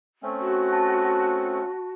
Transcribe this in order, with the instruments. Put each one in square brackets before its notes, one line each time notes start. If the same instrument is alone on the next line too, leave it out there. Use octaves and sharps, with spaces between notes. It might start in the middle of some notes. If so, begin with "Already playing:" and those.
[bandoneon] A3 C4 C#4
[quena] F#4
[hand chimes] A5